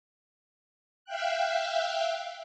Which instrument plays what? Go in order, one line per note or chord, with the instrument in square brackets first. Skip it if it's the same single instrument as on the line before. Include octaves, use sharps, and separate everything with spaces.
[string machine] E5 F5 G5 F#6